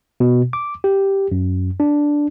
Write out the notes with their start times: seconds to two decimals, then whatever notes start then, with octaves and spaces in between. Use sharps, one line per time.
0.20 B2
0.53 D6
0.84 G4
1.32 F#2
1.80 D4